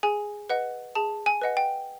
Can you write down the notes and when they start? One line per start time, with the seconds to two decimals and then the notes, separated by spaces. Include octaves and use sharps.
0.03 G#4 G#5
0.50 B4 D#5 F#5
0.95 G#4 A5
1.26 G#5
1.41 B4 D#5 F#5
1.57 G5